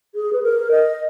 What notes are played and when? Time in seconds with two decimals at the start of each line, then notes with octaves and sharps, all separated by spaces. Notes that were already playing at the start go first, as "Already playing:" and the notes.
0.15 G#4
0.33 B4
0.43 A#4
0.71 D#5